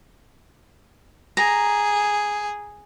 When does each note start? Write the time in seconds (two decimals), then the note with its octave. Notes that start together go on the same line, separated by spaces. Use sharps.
1.37 G#4 A#5